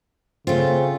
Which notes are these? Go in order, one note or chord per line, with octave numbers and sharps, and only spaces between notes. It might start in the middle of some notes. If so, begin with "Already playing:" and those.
C#3 A3 C4 F4